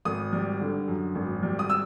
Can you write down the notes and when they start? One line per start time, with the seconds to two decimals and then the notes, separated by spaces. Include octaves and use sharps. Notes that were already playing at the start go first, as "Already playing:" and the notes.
0.05 G#1 D#6
0.33 G3
0.61 D3
0.88 F#2
1.15 G#1
1.43 G3
1.59 D#6
1.70 E6